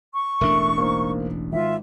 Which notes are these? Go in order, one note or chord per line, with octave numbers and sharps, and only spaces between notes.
C#6
E1 A1 A3 D4 A#4 E5
A#3 D#4 C5
G#1 F4 E5